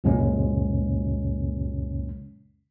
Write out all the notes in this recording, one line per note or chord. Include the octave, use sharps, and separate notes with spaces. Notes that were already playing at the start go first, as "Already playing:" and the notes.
C#2 F#2 A#2 C#3 G#3 C#4